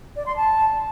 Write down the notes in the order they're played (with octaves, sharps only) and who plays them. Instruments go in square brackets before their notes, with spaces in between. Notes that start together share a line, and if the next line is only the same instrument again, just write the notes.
[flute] D5
C6
A5